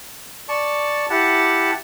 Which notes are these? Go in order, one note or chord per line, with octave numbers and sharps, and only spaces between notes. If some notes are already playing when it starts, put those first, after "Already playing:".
D5 A5 C#6
E4 G4 F#5 A5